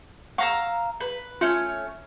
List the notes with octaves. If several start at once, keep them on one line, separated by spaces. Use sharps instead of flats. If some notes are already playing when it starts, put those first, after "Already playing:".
F5 F#5 A#5 C#6 E6
B4
A3 C#4 F4 C#5